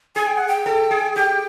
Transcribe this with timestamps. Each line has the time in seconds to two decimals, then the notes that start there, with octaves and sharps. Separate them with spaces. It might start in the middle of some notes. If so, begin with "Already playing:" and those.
0.16 G#4 G#5
0.27 G5
0.37 F#5
0.48 G5
0.66 A4
0.91 G#4
1.15 G4 G5